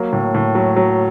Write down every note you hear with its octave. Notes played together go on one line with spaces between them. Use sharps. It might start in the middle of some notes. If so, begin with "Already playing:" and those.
Already playing: F#3 A#3
A2
A2
F#3
F#3